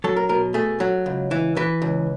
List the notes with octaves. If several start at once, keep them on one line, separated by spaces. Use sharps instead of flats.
F#3 A4
A#4
B2 A#4
A3 G#4
F#3
C#2
E3
E3 B4
C#2